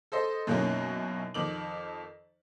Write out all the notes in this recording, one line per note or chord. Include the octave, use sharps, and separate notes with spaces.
A4 C5 D#5
F#2 B2 E3 A#3 C#4 D#4
F2 D#3 D6 F#7